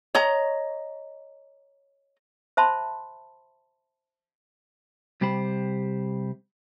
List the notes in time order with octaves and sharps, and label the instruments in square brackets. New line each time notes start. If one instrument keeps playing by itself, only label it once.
[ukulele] C#5 D#5 A#5
[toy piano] C5 E5 A5 B5 C6
[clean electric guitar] C3 G3 G4 C5 B5